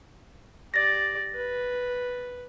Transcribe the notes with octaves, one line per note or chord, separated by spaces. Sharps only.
G4 D5 A6 A#6
B4